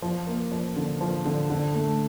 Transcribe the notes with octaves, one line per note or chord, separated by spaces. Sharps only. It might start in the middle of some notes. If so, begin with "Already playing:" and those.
F3
A#3
F3
D3
F3
D3
D3
A3